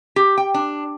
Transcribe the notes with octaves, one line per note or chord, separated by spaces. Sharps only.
G4
G5
D4